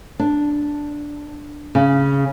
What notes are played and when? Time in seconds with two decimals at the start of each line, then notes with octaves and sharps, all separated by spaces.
0.20 D4
1.75 C#3